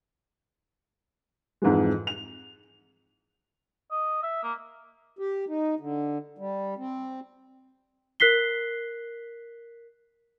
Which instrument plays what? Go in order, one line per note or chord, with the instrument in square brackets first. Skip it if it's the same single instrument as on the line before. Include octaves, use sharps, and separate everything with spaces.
[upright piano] F2 G#2 E3 G#3
F7
[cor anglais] D#5
E5
A#3
[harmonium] G4
D#4
D3
G3
C4
[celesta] A#4 F#6 B6 C7 G7